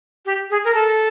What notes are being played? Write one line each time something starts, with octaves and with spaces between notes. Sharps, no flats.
G4
G#4
A#4
A4